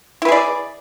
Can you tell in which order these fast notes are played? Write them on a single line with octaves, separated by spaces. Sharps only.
E4 B4 G#4 D5